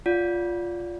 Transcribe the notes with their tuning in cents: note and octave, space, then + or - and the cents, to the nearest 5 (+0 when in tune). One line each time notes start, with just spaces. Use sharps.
F4 +0 D5 -25 F#5 -30